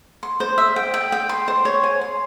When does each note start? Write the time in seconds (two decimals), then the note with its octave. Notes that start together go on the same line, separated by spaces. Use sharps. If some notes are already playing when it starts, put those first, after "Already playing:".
0.23 C6
0.40 C5
0.58 E5
0.76 G5
0.94 G5
1.12 G5
1.29 C6
1.48 C5
1.65 C#5
1.84 G#5
2.01 C6